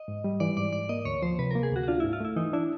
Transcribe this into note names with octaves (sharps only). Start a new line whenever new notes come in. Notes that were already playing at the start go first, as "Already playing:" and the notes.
Already playing: D#5
G#2
G3
E3 D5
G#2 D5
G#2 D5
A#3 D#5
D2 C#5
F3 C5
C3 B4
A#3 A#4
G#4
D2 F#4
F#4
D4 F4
G#2 E4
F4
A3 E4
E3 D#4
D4 E4